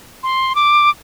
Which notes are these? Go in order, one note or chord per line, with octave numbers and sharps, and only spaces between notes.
C6
D6